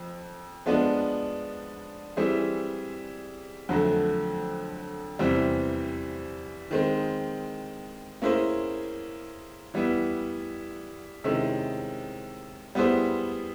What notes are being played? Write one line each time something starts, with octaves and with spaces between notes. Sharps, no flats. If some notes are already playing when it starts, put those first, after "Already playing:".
Already playing: F2
F3 G#3 B3 D4
E3 G3 C4 E4 G#4
F2 D3 F#3 A3
E2 C3 E3 G3 C4
D#3 G#3 C4
A#3 C#4 E4 G#4 C5
E3 G3 B3 E4
C3 D#3 G#3 C#4 E4
G3 B3 E4 G#4 C5